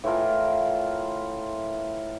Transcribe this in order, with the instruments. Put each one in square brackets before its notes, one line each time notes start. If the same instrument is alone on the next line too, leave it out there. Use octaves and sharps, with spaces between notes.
[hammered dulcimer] A2 E3 F4 A#4